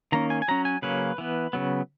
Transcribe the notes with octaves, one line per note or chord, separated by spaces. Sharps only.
D#3 A#3 C#4 A#5
G#5
G#5
F#3 C#4 A#5
G#5
C#3 F#3 A#3 C#4 B4
E3 B3
C#3 F#3 B3